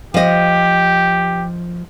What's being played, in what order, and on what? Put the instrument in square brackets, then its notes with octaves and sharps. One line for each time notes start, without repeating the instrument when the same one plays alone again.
[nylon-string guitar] F3 D#5 [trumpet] G4